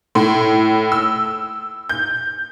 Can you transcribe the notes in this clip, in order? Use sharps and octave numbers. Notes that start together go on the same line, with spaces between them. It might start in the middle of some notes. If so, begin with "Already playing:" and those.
A2
E6
G6